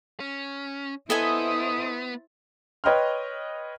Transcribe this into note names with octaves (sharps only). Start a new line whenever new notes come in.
C#4
B3 E4 A4 C5 D#5 G#5 D#6
B4 C#5 D#5 G5 C6 F6